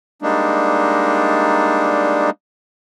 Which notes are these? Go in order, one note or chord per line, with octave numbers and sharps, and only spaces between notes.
G3 G#3 A#3 D4 D#4